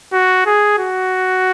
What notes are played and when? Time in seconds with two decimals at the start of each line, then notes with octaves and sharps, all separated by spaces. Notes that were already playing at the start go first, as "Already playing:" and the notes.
0.12 F#4
0.46 G#4
0.79 F#4